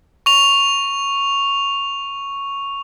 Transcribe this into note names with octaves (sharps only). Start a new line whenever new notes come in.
C#6 F7